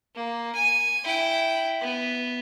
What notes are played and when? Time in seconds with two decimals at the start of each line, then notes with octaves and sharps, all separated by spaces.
0.15 A#3
0.55 G#5
1.04 E4 G5
1.81 B3